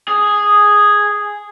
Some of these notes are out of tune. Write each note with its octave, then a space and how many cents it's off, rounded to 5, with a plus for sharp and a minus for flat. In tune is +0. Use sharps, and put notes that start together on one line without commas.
G#4 -5